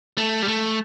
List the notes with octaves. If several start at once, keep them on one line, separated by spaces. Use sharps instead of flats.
A3
G3
A3